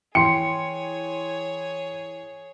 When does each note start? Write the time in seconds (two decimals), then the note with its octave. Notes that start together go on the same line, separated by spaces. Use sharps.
0.15 E3 G#4 C#5 G5 C6 C#7